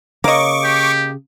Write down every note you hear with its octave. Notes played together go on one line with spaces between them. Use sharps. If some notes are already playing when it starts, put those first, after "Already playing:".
C#3 A#3 D#5 C#6 D6
G4